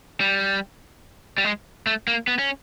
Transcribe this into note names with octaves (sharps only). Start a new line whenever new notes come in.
G3
G3
G#3
A3
A#3
B3
C#4